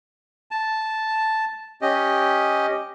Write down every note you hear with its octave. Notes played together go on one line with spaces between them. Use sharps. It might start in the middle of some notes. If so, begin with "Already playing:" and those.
A5
C#4 G4 D#5